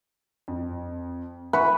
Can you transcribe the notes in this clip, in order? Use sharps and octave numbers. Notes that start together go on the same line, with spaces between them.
F2
B4 E5 F#5 C#6